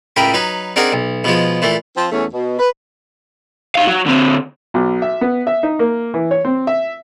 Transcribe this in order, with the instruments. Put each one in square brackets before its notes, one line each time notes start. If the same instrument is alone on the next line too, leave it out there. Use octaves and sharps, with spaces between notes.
[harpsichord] C#2 A2 A#4 G5 B5
F#3 D#4 B4
C4 D4 D#4 G#4 A#4 F#5
B1
B2 F3 G#3
A#2 E3 A3
[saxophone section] F3 C4
E2 A3 C#4
B2
B4
[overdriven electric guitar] D#4 F5
F#3
D3 C4
[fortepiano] B1
E5
B3
E5
D#4
A#3
E3
C#5
C4
E5